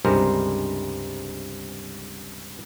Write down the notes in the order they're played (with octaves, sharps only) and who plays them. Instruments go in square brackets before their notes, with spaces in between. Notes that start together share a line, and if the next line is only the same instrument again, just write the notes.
[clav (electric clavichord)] C#2 G2 C3 G#3 A#4 C5